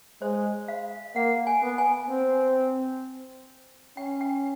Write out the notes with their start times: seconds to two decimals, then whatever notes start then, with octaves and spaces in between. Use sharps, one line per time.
0.21 G#3 C5
0.68 F5
1.16 A#3 F#5
1.47 G#5
1.62 B3
1.78 G#5
2.09 C4
3.97 C#4 G5
4.21 G5